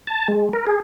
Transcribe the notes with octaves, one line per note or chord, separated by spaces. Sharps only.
A5
G#3
A#4
G#4